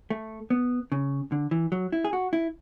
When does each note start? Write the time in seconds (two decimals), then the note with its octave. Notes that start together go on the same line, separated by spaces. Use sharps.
0.10 A3
0.50 B3
0.92 C#3
1.32 D3
1.51 E3
1.72 F#3
1.92 E4
2.05 G#4
2.13 F#4
2.33 E4